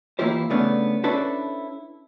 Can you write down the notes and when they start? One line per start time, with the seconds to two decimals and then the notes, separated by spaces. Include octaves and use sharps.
0.19 E3 A#3 E4 F4 G4 C5
0.50 C#3 G3 A3 B3 C#4 D4
1.04 C#4 D4 E4 A4 B4 C5